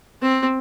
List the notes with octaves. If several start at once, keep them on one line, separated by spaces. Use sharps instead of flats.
C4